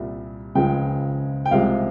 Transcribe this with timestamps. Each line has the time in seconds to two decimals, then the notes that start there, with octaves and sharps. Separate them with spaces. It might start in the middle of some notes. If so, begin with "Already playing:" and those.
Already playing: C2 A#2 G3
0.55 C#2 C#3 F3 G#3 G5
1.46 G5
1.51 C2 C3 F3 G#3 F5